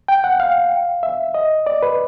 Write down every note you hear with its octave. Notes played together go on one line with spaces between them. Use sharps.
G5
F#5
F5
E5
D#5
D5
B4